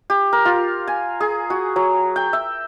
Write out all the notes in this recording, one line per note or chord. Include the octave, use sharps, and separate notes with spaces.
G4
A#4
F4
G#5
G#4
F#4
F#3
G5
E5